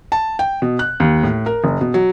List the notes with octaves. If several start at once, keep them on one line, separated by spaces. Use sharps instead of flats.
A5
G5
B2
F#6
D#2
A2
A#4
F#1
B2
F#3